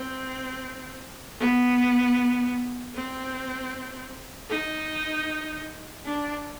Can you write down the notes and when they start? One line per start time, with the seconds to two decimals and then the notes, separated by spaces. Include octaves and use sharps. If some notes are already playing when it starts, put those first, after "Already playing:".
Already playing: C4
1.40 B3
2.95 C4
4.49 D#4
6.05 D4